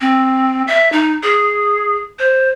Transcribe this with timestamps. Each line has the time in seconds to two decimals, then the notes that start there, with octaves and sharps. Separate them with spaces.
0.01 C4
0.67 E5
0.92 D#4
1.23 G#4
2.19 C5